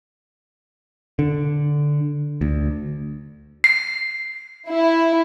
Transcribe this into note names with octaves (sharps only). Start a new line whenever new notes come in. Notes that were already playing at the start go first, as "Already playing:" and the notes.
D3
D2
C7
E4